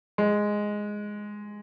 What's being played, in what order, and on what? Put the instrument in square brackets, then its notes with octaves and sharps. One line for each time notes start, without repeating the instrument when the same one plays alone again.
[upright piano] G#3